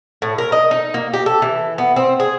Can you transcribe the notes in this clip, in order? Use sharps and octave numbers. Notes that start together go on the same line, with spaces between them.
A2
A#4
D#5
D#4
A#3
G4
A4
E3
B3
C4
G#4